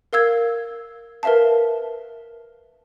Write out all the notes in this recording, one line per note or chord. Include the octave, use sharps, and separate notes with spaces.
A#4 F5 E6 G#6
A#4 B4 E5 F5 A5